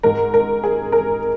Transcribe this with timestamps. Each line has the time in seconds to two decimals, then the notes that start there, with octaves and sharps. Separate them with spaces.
0.03 G#2 G#3 A#4
0.34 A#4
0.64 G#4
0.92 A#4